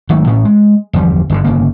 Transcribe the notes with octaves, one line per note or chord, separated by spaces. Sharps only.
G#1 D#3 F#3 A3
A1 A2 C#4
G#3
G1 E2 F3 G3
G1 G2 B2 D3
G1 C#3 A#3